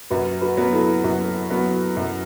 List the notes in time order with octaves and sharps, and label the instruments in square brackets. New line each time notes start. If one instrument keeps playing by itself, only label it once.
[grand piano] F#2 [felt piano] F#4 B4
[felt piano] F#4 B4
[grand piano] F#3 B3
[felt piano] E4 A4
[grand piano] F#2 [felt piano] F#4 B4
[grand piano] F#3 B3
F#2